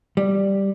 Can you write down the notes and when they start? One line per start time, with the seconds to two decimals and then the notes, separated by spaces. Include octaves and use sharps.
0.17 G3